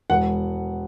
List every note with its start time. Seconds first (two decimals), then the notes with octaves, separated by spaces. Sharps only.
0.10 E1 F#5